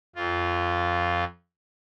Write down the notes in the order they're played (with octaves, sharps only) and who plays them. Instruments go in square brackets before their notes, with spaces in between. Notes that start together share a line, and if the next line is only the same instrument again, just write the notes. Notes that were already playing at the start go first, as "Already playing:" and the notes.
[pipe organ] F2 F4